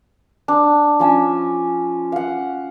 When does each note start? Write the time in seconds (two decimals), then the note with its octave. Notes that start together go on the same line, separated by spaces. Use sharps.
0.48 D4
1.00 F3 C#4 E6
2.12 F5 F#5